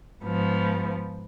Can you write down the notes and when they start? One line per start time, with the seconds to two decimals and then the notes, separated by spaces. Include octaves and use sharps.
0.24 G#2 F3 B3